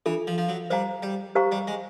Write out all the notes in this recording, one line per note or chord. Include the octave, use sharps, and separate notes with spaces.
E3 D4 F4 A4
F3
F3
F#3
G3 C5 F5 A#5
G3
G4 C5 F5 A#5 C#6
G3
G#3